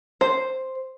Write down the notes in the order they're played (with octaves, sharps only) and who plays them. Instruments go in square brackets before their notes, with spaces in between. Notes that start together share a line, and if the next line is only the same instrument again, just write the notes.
[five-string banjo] C5